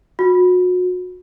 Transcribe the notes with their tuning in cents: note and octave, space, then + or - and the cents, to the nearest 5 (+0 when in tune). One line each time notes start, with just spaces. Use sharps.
F#4 -35